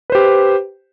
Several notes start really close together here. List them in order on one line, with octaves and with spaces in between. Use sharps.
B4 C5 G4